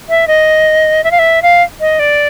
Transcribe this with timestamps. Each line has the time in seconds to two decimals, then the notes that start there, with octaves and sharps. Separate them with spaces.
0.09 E5
0.28 D#5
1.04 E5
1.11 F5
1.19 E5
1.42 F5
1.81 D#5
1.99 D5